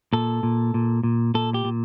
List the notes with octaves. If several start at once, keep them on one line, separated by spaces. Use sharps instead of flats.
A#2 A4
A#2
A#2
A#2
A#2 A4
G4
A#2